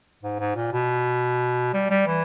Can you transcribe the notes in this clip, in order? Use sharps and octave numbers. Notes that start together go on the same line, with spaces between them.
G#2
G#2
A#2
B2
G3
G3
E3